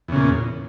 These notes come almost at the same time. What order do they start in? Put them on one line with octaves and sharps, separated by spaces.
E2 C#3 A#2